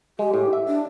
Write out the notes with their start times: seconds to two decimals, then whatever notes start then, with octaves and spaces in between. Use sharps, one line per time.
0.19 G#3 G4
0.34 A2
0.53 E5
0.67 D4